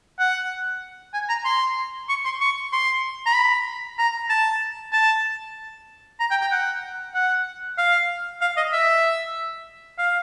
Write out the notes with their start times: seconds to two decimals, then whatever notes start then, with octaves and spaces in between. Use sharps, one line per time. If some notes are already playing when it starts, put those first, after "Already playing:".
0.20 F#5
1.14 G#5
1.29 A#5
1.45 C6
2.09 C#6
2.25 C6
2.41 C#6
2.73 C6
3.26 A#5
3.35 B5
3.99 A#5
4.29 A5
4.93 A5
6.20 A#5
6.31 G5
6.41 G5
6.52 F#5
7.14 F#5
7.78 F5
8.41 F5
8.57 D#5
8.73 E5
9.99 F5